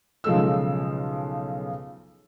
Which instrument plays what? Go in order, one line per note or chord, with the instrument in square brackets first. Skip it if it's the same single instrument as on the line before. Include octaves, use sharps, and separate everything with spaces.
[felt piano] B1 C#3 F3 G#3 A4 E6